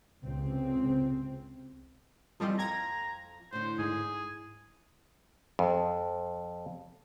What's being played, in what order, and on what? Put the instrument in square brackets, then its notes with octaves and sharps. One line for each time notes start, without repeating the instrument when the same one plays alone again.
[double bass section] C#2 C3 C4
[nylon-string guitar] E3 A4 D#5 [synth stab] F3 G3 C4
[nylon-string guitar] F2 F5 G5 [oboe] A#5 [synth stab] G#6 A#6
[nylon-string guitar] A2 D3 [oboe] C5
[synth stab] G#2 [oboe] G#4
[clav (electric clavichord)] F2